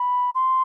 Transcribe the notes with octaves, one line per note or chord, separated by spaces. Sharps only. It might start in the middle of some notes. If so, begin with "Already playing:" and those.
Already playing: B5
C6